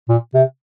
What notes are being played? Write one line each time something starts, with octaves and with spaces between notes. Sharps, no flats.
A#2
C3